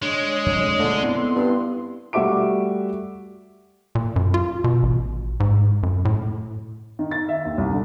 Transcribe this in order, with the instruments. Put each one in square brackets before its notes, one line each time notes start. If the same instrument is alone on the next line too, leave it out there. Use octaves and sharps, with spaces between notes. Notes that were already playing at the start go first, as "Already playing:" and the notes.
[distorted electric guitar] G#3 [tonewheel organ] D4 C#5
[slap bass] F2
[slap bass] A#2 A3 [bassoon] D3
[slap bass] B3 [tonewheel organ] C4 E4 C6
[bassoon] G2
[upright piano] G3 A3 F#4 E5 D6 D7
[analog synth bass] A#2
F#2
F4
B2
A1
G#2
F#2
A2
[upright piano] D#3
A6
E5
D#2
C2
D3